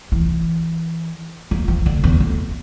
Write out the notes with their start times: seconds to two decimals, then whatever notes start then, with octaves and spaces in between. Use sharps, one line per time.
0.12 E3
1.51 F3
1.68 F3
1.86 D3
2.04 E2
2.20 F2